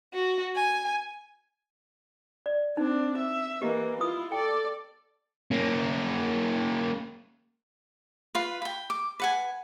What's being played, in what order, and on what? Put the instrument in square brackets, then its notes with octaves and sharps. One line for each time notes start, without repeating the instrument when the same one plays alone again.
[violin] F#4
G#5
[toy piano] D5
[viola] C4 D4 [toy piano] D#4
[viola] E5
[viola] E3 A#3 [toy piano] G4 D#5
[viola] E4 F4 [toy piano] D#6
[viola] A4 D5 [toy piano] G5
[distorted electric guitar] A#3 C#4
[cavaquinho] F4 B4
G5 B5
D6
B4 F#5 G#5